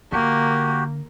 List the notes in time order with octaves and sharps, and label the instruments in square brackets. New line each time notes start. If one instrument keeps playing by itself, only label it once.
[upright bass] D3 [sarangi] A#3 [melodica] F#4 G4